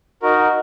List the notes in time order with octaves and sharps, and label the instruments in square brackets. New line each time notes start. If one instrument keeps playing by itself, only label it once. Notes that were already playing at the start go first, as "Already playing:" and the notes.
[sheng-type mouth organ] D#4 F#4 A#4